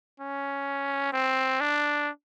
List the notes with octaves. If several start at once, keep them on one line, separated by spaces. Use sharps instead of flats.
C#4
C4
D4